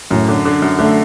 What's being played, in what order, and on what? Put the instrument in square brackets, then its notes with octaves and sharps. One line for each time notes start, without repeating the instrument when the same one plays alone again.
[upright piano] F#2 [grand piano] A2
[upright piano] D3
D3
F#2
[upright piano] D3 [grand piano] A3